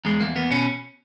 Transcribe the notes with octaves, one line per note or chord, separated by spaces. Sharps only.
E2 G#3
E2 A#3
E2 B3
B2 C#4